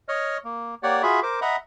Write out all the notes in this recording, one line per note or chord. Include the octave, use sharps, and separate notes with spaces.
C#5 D#5 F6
A#3
A#3 G4 C#5 D5 F#5
F4 F#4 G#4 E5 B5
A#4 C5 D6
D#5 E5 F#5 A#5 B5